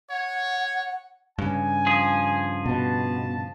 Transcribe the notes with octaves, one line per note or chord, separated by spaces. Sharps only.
C#5 F#5
G2 C#3 G#5
F3 G#4
B2 A5